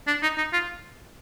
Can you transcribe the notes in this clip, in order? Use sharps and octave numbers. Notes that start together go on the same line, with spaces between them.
D4
D#4
D#4
F4